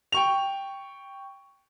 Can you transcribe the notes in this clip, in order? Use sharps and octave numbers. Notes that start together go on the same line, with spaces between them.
G5 C#6 F7